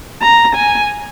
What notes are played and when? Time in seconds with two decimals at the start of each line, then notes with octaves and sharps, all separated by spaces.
0.22 A#5
0.56 G#5